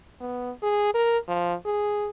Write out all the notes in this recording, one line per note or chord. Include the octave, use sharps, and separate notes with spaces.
B3
G#4
A#4
F3
G#4